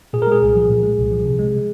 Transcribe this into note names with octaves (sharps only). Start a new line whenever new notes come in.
A#2 G#4
A#4
G#3 G#4
C2
F3
A#2
G#3
C2
F3
C3
G#3